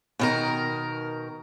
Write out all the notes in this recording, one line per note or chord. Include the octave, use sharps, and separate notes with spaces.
B2 D#3 A#4